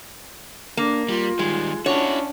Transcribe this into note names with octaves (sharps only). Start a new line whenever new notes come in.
A#3 D4
G3 F4
D#3 G3 G#3
C#4 D4 E4 F#4 C#5